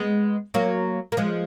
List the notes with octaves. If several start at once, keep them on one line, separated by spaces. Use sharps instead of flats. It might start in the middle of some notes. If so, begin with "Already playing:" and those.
Already playing: G#3 B3
F#3 A#3
A#3
F3 G#3